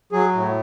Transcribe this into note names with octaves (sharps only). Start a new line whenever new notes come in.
F#3 G#4
A2